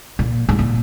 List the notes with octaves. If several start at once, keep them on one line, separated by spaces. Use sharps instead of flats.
A#2
G#2
A#2